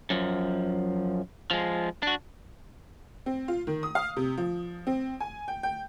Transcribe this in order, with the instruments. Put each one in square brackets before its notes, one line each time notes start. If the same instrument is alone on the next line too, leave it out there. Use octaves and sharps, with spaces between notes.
[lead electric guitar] F#2 F3
F3 G#3
D4 F#4
[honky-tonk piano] C4
F4
D#3
D#6
F5
C3
F3
C4
G#5
G5
G5